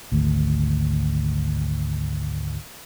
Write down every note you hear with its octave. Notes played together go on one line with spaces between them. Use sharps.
G#1 D2